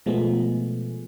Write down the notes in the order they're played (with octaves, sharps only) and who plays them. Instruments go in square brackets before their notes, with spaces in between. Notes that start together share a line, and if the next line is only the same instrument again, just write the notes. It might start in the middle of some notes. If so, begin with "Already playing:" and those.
[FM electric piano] B2 F3 G#3 A3 B3 G#4